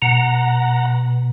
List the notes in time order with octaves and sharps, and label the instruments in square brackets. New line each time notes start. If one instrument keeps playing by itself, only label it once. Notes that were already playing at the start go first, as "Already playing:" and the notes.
[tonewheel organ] B2 F#5 A#5